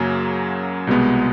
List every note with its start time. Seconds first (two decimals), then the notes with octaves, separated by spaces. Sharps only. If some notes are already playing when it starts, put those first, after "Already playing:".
Already playing: F#2 C#3 F#3 A#3
0.87 C2 B2 G#3 B3